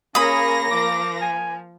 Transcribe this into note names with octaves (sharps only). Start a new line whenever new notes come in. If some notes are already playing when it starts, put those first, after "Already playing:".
A#3 C#4 G#4 C#5 B5 D#6 A#6
F3 D6
G#5